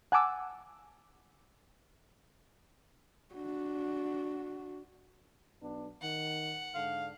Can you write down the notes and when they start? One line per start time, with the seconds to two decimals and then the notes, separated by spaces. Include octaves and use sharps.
0.12 F#5 G#5 A5 D6 E6
3.34 D4 F#4
5.61 B1 B3 D4
6.02 D#3 F#5
6.75 G#2 D3 D4 F5